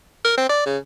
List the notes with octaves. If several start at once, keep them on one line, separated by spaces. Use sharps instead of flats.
A#4
C4
D5
C#3